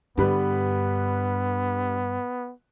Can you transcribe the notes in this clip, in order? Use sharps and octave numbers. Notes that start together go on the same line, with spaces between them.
G2 D3 G3 B3 B4